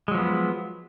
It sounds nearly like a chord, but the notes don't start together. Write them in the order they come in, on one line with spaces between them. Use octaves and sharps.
G#3 F#3 F3 B3